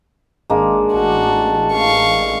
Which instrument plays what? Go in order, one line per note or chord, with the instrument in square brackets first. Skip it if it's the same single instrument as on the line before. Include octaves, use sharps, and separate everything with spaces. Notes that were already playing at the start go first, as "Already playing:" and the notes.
[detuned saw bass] G#1 [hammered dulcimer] G#3 A#3 D4
[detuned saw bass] A1 [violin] F#4 [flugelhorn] A5
[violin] F5 C#6